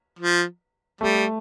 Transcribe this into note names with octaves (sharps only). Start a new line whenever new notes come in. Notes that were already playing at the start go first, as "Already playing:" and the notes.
F3
G3 A3